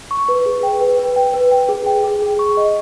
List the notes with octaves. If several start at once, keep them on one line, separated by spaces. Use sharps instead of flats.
C#6
B4
G#4
G5
B4
B4
G5
B4
G5
G#4
G5
G#4
G#4
C#6
D#5